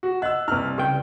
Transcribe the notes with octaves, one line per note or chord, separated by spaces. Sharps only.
F#4
D#5 F#5 E6 F#6
C2 E4 B4 F6
C#2 G4 B4 D5 G5